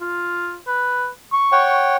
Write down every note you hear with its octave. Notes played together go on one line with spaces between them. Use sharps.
F4
B4
C#6
C#5 F#5 G5